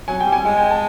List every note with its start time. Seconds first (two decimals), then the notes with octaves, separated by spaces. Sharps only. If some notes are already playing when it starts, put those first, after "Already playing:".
0.08 F#3 G#5
0.20 G5
0.26 G3
0.32 G#5
0.45 G#3 G#5
0.57 G5
0.70 A5